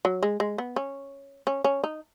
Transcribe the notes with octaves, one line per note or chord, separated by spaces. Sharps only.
F#3
G#3
G#3
B3
C#4
C#4
C#4
D#4